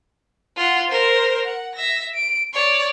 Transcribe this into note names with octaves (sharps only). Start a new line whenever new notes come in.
F4 F#5
A#4 C5
F#5
E5 A#6
D7
C#5 D5